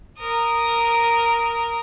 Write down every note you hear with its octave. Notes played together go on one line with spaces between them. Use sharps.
A#4 D#6